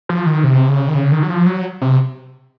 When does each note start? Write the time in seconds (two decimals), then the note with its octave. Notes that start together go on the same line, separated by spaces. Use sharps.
0.09 F3
0.26 D#3
0.44 C3
0.68 C#3
0.88 D#3
0.95 C#3
1.12 D#3
1.23 F#3
1.30 F3
1.46 F#3
1.81 C3